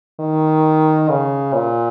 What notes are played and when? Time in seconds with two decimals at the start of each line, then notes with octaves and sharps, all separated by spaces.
0.20 D#3
1.09 C#3
1.54 A#2